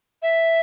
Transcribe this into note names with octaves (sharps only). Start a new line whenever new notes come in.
E5